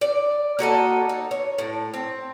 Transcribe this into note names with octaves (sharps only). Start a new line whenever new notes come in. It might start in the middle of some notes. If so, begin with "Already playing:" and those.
D5
A#3 F#4 A4 D#5
D#4
C#5
A2
C4